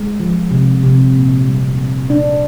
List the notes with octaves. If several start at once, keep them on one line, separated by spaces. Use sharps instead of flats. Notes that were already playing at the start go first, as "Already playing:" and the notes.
Already playing: G#3
F3
C3
C3
A#2
G3
A#2
A#2 D4